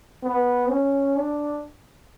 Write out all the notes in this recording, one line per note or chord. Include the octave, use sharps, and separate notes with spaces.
B3
C#4
D4